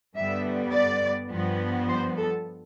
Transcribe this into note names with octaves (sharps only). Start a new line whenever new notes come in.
G2 D3 G3 B3 E5
D5
G2 F3 B3
C5
A4